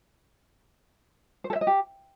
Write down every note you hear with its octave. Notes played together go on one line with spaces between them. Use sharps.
C5
A4
E5
D#5
G4